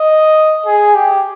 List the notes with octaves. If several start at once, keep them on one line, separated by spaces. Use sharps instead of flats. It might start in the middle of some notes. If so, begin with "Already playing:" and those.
Already playing: D#5
G#4
G4